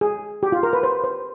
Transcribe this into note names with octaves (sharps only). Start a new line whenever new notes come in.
G#4
G4
F4
A#4
B4
C5
C5